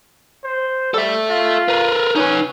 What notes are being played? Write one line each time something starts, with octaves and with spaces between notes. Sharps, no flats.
C5
G3 A4 E5
F4
A#4 B4
C#4 D#4 B4